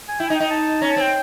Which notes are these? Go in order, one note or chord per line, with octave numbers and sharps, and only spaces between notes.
G#5
E4 G5
G#5
D#4
G5
D#4
A5
C#4 A#5
A5
C4 G5